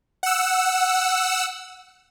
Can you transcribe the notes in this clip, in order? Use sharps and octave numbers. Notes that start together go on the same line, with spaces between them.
F#5 E6